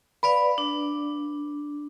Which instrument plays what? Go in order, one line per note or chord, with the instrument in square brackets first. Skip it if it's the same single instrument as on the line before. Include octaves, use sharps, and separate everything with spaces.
[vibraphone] B4 D5 F5 [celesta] B5
[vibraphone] D4